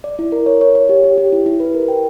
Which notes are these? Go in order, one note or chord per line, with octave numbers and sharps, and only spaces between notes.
D5
E4
A#4
C#5
C#5
C#5
G4
G4
G4
E4
E4
B4
A#4
G5